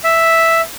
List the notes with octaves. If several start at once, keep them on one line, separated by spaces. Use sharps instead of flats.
E5